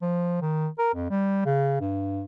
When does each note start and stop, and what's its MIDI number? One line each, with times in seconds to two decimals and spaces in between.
0.02 0.41 53
0.42 0.68 51
0.79 0.90 70
0.94 1.09 41
1.10 1.44 55
1.45 1.75 49
1.81 2.24 43